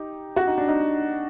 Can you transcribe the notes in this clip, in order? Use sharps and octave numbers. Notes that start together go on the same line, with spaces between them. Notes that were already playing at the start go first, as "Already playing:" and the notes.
Already playing: D#4 G4
F#4
D#4
D4
D#4